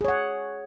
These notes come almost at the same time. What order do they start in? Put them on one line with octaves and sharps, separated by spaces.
G#4 C#5 F#5